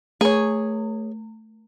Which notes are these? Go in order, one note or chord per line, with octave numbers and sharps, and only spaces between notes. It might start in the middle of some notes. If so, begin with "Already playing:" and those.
A3 G#4 C#5